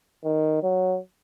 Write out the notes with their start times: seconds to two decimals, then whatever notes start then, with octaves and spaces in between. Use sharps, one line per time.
0.24 D#3
0.63 F#3